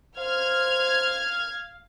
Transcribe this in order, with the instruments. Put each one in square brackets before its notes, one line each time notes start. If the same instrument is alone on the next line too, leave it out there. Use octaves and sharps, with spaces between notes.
[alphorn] C5 [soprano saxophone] F5 [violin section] F6 G#6